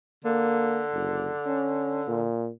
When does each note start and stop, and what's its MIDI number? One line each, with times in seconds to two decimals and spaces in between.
0.25 2.30 50
0.25 0.82 58
0.93 1.30 30
1.46 2.02 61
2.08 2.49 46